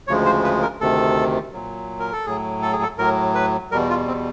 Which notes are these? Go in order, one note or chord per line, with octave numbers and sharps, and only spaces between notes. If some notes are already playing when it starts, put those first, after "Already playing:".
D2 C#3 F3 G#3 C#5
C5
B4
A#4
D2 C3 D#3 A4
A#2 F#3
A#4
A4
A2 F#3 G#4
A4
G#4
A4
A2 F#3 A#4
B4
E2 B2 G3 A#4
F4
C4